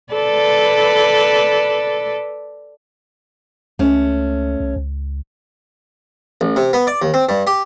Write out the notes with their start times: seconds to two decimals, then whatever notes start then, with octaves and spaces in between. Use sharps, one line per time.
0.13 A4 B4 D5
3.79 C#2 A3 C#4
4.60 C2
4.76 C#2
6.41 A1
6.56 C3
6.73 B3
6.87 D5
7.02 D#2
7.14 C4
7.29 G2
7.47 G4